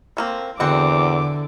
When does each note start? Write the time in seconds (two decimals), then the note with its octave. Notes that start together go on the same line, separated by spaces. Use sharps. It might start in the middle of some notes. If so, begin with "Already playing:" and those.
0.17 A3 A#3 C4
0.60 E2 D3 C4 F#4 F#5 D6